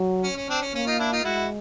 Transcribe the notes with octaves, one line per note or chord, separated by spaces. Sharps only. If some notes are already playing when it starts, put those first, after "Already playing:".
Already playing: F#3
C#4
C#4
C4 D4
C#4
A#3 C#4
D#4 F4
D4 E4
D#4 F4
G#3 E4 F#4